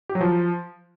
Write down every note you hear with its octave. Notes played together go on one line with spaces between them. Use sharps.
G4
F#3
F3